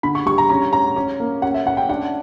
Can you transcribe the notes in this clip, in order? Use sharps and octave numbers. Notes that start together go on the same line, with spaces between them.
D3 B5
C#6
G3 C#6
A#5
C#4 A#5
C#4 A#5
C#4
A#3
C#4 F#5
E5
C#4 F#5
G5
D4 F#5